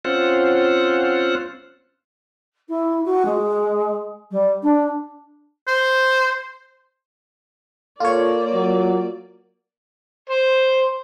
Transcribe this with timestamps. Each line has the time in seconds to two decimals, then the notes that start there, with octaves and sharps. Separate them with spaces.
0.05 C4 C#4 F4 C5 F#5
2.68 E4
3.05 F#4
3.25 G#3
4.31 G3
4.62 D4
5.67 C5
8.00 A#3 F4 A4 C#5 D5
8.53 F#3
10.29 C5